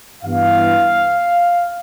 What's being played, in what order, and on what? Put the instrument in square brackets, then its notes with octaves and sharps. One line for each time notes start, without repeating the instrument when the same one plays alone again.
[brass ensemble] G2 E3 B3 F5